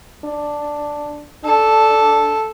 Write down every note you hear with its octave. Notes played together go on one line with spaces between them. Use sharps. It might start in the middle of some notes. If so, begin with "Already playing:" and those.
D4
D4 A4